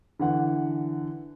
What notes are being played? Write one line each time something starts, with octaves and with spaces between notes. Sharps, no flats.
D3 E3 F#5